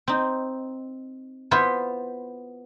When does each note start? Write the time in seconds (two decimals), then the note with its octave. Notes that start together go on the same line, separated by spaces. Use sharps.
0.08 C4 D#4
1.51 B3 E4 F4 C5